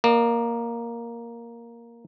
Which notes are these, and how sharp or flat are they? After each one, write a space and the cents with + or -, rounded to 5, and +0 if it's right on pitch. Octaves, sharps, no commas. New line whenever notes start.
A#3 +5 D#5 -45